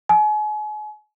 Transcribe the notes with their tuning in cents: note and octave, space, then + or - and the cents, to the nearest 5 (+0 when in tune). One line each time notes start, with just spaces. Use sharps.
G#5 +35